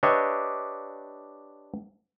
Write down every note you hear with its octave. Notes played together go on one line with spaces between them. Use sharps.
D4 G4 B4 C#5 D#5 E5